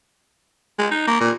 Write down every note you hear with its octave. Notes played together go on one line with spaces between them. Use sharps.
G#3
D#4
A#3
A#2